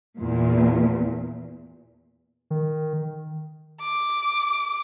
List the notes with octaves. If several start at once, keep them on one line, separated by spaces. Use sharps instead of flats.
E2 A#2
D#3
D6